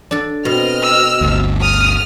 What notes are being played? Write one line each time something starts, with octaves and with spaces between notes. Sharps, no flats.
D4 A4
B2 C4 D#5 F6
E6
G1 D2
D#6 F6